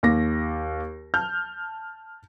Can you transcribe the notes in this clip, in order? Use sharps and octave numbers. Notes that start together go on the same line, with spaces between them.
D#2 D6 A#6
A5 F6 G6